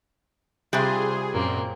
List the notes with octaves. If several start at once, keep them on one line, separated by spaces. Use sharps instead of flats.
C3 G3 F4 G#4 C5
F#2 A#2 A#3 C4